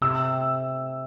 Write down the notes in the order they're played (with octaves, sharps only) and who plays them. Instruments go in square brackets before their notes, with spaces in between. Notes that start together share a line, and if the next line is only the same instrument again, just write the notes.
[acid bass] C3 [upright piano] E6